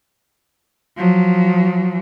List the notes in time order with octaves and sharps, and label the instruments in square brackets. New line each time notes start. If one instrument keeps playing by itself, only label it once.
[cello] F3 F#3